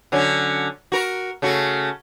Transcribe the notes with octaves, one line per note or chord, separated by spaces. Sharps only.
D3 F#3 C#4
F#4 A#4
C#3 A3 F#4